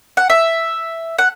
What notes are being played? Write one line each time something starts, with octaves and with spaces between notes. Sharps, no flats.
F#5
E5
F#5